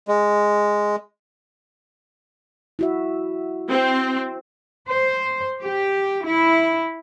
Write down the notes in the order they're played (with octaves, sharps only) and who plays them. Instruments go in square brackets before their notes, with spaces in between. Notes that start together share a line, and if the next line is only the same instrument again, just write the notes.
[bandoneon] G#3
[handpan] E4 F#4 E5
[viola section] C4
[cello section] C5
G4
E4